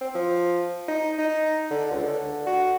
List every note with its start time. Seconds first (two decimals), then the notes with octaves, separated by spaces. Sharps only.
0.01 C4
0.15 F3
0.88 D#4
1.18 D#4
1.71 D3
1.91 C#2
2.03 D3
2.47 F#4